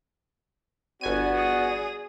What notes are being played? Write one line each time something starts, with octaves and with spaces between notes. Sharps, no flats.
G1 B3 F#4 D5 G#5 D#7
G#4 D#6